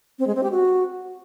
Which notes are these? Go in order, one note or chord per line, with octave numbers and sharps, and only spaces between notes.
C4
G#3
C4
G4
F#4